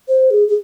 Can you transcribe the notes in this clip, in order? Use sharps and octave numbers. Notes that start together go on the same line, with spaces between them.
C5
G#4
G#4